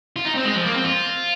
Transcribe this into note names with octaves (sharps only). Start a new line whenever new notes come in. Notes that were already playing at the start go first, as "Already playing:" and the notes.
F4
D#4
C4
G#3
F3
A#3
C4
F4